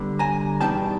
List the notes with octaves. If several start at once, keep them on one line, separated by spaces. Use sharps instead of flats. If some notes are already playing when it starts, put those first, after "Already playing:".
Already playing: D3 G3 B3 D4
G#5 A#5
E2 B2 G3 B3 D#4 G5 A5